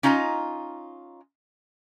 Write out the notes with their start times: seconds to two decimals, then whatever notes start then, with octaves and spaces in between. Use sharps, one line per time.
0.03 C#4 D#4 F4 D#5 A5 A#5